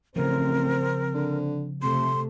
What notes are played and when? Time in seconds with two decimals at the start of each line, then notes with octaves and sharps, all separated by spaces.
0.16 A1 C#3 F3 C4 A#4
1.14 D3
1.82 F2 C3 A3 C6